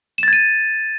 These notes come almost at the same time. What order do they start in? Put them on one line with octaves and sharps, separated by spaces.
E7 A6 G#6 D#7